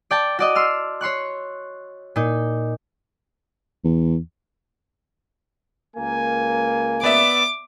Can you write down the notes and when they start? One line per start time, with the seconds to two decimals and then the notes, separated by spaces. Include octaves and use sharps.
0.11 D5 G5 A5
0.39 F#4 D5 D#5
0.55 C6 E6 F6
1.01 C#5 C6 C#6 F#6
2.16 A#2 D#4
3.84 E2
5.97 C#2 A#3 G#5
7.03 B3 D5 E5 D6